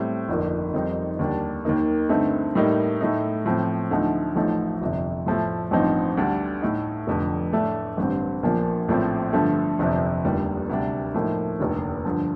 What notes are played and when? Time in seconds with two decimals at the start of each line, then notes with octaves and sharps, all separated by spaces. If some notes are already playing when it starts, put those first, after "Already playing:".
Already playing: A2 G3 C4
0.29 G1 F2 D#3 A#3
0.74 F2 D#3 G3 C4 D#4
1.19 D#2 D3 G3 D4
1.65 D#2 D#3 A#3 D#4
2.09 G2 D3 A3 C4 D#4
2.55 A2 G3 A#3 D#4
3.01 A2 A3 D#4
3.46 A2 F3 C4
3.91 D2 D3 F3 A3 D#4
4.35 A1 A2 F3 A3 D#4
4.81 G1 F2 C3
5.26 A2 F3 A3
5.71 A1 G2 F3 C4 D#4
6.17 D2 D3 G3 D4
6.62 A2 A3 D#4
7.07 F1 F2 D3
7.52 A2 A3 D4
7.97 A1 G2 D3 G3 C4
8.43 A#1 A#2 F3 A#3 D4
8.88 A#1 A2 F3 C4
9.33 G2 D3 F3 A3
9.79 G1 F2 C3 F3
10.25 F1 D#2 D3 G3
10.69 D2 C3 G3 D4
11.14 A2 F3 A#3 D#4
11.59 F1 D#2 D3
12.05 G2 D3 F3